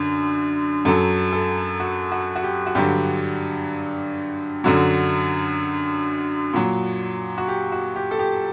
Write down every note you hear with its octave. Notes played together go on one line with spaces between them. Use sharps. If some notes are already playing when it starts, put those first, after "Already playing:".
Already playing: F#2 D3
F#2 F#3 A4
A4
F#4
F#4
F#4
G4
F#4
G2 D3 F#3 G4
F#2 D3 F#3
A#2 F#3
F#4
G4
F#4
G4
A4
G4